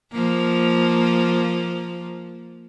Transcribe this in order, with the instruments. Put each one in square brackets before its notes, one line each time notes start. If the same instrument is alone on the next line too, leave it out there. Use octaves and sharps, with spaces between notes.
[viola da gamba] F3 A#3